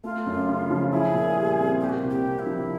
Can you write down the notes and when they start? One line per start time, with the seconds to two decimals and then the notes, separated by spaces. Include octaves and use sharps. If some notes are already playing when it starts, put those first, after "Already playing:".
0.04 A3 F4
0.26 F#2
0.49 C#3
0.70 F3
0.92 E4 G#4
1.14 A#2
1.37 G3
1.59 C4
1.81 A#3 G4
1.89 F#4
1.98 G4
2.03 C2
2.10 G4
2.25 C3
2.39 E4
2.46 F3